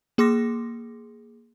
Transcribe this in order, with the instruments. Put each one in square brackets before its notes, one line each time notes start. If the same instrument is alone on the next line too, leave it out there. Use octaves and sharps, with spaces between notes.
[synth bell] A#3 G#4 C6 D6 A#6